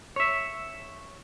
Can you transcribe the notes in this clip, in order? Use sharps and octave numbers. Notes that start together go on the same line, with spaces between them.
C#5 E5